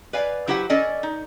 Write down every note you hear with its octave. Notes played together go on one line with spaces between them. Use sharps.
B4 D5 F5 G#5
F#3 E4 G4 C5 F#5
C#4 A4 D5 D#5 G#5
D#4